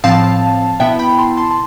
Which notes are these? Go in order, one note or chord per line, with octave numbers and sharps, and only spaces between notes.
A2 F3 C4 F5 A5
B2 B3 E4 E5 G5
G5 B5
A5 C6
A5 C6
A5